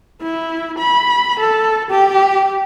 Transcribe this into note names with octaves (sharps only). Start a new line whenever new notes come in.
E4
B5
A4
G4